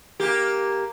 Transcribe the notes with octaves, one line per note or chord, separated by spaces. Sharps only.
A#3 G4